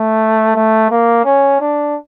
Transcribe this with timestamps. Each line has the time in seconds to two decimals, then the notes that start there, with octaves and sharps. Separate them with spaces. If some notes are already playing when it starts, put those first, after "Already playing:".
Already playing: A3
0.56 A3
0.91 A#3
1.25 C#4
1.60 D4